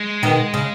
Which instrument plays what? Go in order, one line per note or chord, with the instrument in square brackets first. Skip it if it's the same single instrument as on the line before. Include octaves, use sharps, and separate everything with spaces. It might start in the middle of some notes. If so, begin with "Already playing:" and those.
Already playing: [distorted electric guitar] G#3
[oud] B2 D#3
C#3